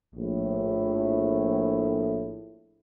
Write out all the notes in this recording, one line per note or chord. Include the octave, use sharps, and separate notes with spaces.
A#1 A2